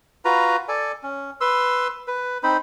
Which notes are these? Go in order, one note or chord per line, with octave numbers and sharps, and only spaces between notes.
F4 F#4 B4 A#5
A4 D5 G#5
C#4
B4 C6 E6
B4
C4 D#4 C5 B5